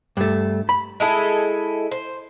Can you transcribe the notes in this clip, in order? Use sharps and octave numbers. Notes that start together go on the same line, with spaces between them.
G2 A3
B5
G#3 E4 A4
C5